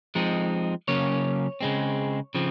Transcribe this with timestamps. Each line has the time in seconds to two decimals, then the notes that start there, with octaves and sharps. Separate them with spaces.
0.15 F3 G#3 C4 D#4
0.88 C#3 F#3 A#3 C#4 C#5
1.61 C#3 G#3 C4
2.35 C#3 F3 C4